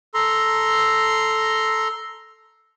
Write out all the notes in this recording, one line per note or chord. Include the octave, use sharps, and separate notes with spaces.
A4 A#5 C6